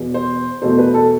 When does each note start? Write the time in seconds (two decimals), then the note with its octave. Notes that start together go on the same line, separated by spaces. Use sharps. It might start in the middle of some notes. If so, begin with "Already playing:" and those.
Already playing: E2 B2 B3
0.14 C5
0.61 E2 B2 A3 C5
0.78 B4
0.94 A4